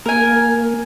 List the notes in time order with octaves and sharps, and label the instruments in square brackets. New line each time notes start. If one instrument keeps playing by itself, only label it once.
[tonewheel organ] A#3 [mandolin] A#4 G#5